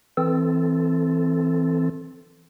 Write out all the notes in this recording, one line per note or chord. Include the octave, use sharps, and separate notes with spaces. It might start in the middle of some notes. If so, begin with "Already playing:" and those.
E3 C4 A4